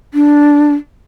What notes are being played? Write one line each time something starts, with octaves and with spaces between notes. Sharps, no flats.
D4